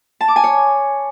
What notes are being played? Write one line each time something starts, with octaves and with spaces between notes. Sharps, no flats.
A5
D6
G#5
C#5